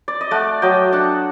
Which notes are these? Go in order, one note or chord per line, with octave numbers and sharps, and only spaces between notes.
D5
D#5
A3 D5 F#5
F#3 D#5 G5
D4 F#5 A5